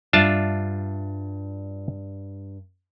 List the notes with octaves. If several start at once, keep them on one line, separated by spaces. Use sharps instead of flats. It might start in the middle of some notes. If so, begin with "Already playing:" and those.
G2 D4 F4 E5 A5